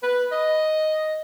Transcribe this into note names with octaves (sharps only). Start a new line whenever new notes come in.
B4
D#5